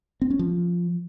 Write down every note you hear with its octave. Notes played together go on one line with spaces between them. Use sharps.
C4
C#4
F3